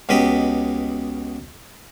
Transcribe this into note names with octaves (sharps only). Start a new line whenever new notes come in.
C#2 B2 G4 D#5 B5